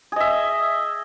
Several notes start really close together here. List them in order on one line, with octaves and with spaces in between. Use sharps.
G#4 D#5 E5